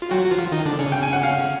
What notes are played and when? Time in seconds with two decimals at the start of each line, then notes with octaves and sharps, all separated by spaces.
0.02 F4
0.11 F#3 F#4 G5
0.25 F#4
0.31 F3 F4
0.52 D#3 D#4
0.65 D3 D4
0.79 C#3 C#4
0.92 G5
1.03 G#5
1.13 F#5
1.23 F5